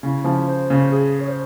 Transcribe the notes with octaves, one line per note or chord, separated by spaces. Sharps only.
C#3 E4
C#3 F3
C5
C#3
G#4
C#5
C5